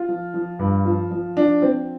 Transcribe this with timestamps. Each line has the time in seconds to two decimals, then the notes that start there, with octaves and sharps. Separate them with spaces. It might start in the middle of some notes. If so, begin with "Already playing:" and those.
Already playing: F4
0.09 F3
0.34 F3
0.59 G2
0.85 F3
1.11 F3
1.37 F3 D4
1.62 F3 C4